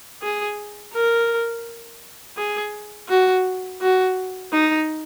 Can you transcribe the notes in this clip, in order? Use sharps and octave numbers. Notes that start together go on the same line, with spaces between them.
G#4
A#4
G#4
F#4
F#4
D#4